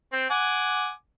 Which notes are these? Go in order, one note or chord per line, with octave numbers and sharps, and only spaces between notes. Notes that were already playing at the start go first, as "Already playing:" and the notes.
C4
F#5 G#5 D6